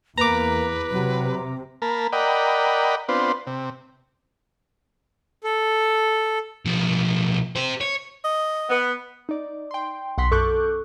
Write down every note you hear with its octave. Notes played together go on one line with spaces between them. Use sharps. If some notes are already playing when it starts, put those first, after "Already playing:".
E2 A#3 B4 A#5 D6
C3 F#3
A#3 A#4 A5 B5
A#4 D5 D#5 F#5 G5 B5
B3 C4 D4 F4 B4 C5
C3
A4
B1 F3
G4 C5
C#5
D#5
B3
D#4 D5
G5 C6
B1 F#5 C6 B6
F#2 A4 C#6 D6 F#6 G6